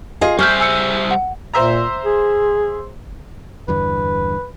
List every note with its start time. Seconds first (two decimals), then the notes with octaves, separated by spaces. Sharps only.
0.21 F4 G#4 D#5
0.39 G3 G#4 C5 E5 C#6 F6 G6
0.60 G#5 E6 C#7
1.11 F#5
1.54 A#2 C5 E5 A#5
2.05 G#4
3.68 E2 G2 D3 B4